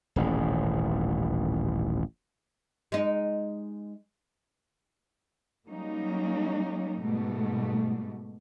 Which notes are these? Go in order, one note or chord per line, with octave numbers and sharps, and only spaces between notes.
D#1 A1 G#2
G#3 D#4
F#3 G3 A#3 C#4 D#4
G#2 B2 G3 A3